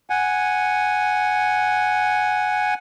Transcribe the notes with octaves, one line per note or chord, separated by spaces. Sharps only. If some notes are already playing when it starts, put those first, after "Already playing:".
F#5 G#5